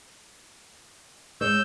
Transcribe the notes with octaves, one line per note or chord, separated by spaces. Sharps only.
G#3 C#5 E6 G6